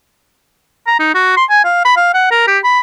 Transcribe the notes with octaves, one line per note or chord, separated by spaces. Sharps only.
A#5
D#4
F#4
C6
G#5
F5
B5
F5
F#5
A#4
G4
B5